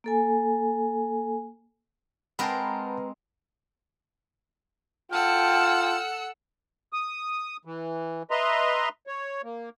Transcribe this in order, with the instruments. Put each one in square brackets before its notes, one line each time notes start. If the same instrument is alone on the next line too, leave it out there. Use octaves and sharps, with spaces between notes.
[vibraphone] A#3 A4 G#5
[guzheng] G#3 C4 A#4 [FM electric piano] B4 A#5 [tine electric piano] F#5 G5 A5
[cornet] F4 [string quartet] A4 F#5 E6 [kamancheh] G5 A5 [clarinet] F6
[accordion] D#6
E3
B4 D#5 E5 A#5 C6
C#5
A#3